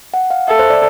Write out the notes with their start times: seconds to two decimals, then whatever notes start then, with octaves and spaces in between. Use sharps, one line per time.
0.14 F#5
0.30 F5
0.48 A4 E5
0.59 C5
0.70 D5